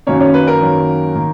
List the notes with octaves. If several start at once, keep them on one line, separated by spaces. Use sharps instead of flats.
F#2 D#3 F#3 A#3 C#4 C#5
C#4 C#5
B4
A#4
F#2 D#3 F#3 A#3 C#4
D#3 A#3